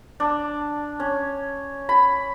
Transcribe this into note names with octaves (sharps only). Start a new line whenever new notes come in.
D4
C#4
B5